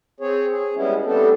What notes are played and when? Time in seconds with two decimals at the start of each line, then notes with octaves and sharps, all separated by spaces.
0.20 C4 G#4 C#5
0.51 G#4
0.76 G3 G#3 B3 C#4 E4
1.05 G3 A3 B3 C4 D4 A4